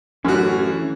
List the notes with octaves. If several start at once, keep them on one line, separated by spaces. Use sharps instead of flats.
A1 F#2 D3 E3 C#4 F#4